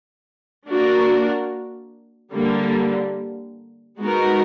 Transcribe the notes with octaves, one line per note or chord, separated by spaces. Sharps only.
A#3 D4 F#4 A#4
D3 G3 A#3
G#3 B3 D#4 F#4 A#4